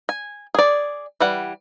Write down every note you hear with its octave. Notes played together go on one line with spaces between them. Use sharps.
G#5
G#4 D5
E3 G3 F#5